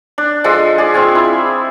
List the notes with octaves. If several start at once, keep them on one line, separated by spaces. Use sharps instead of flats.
D4
F3 G#3 D4 A4
G#4 D5
C4 F4 G#5
E4